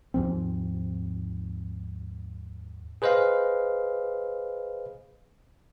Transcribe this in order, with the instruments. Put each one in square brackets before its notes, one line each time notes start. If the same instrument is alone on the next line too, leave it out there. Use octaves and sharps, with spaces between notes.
[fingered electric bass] D#2 G#2 F3 C4
[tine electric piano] G#4 B4 C5 D#5 F5